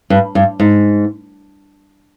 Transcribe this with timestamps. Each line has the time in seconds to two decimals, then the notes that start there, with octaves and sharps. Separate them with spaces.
0.10 G2
0.35 G2
0.60 G#2